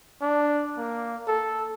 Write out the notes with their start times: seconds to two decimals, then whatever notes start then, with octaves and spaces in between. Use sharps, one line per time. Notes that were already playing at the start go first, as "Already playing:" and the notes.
0.21 D4
0.77 A#3
1.28 A4